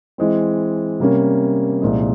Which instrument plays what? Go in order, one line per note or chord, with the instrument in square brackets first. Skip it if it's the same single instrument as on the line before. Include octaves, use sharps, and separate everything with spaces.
[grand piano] E3 G#3 C4
C3 G3 A#3 C#4
C2 A#2 F3 G#3